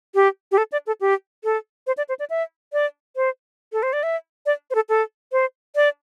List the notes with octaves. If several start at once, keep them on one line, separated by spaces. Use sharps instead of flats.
G4
G4
A4
D5
A4
G4
A4
C5
D5
C5
D5
E5
D5
C5
A4
C5
D5
E5
D5
C5
A4
A4
C5
D5